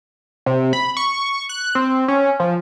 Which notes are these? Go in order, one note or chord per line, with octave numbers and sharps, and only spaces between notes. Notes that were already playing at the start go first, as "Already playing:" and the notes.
C3
B5
C#6
F#6
C4
C#4
F3